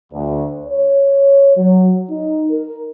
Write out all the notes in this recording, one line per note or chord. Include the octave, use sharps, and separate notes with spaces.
D2
C#5
F#3
D#4
A#4